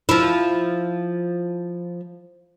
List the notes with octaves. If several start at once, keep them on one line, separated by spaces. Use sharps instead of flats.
F3 E4